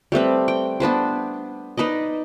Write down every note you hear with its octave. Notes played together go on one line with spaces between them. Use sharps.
G3 A3 C4 B4
G5
B3 D4 B4 C5
D#4 B4 D5 D#5